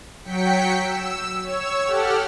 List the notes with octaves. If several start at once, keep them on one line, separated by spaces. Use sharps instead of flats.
F#3 G5 B6 C#7
E6
C#5 E6
G4 A4 F#5 F6